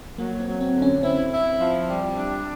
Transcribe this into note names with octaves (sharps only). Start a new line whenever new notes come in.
F#3 A#3
C4
F#3
C4
D3
C#4
C4 E4
E4
F3
G3
D4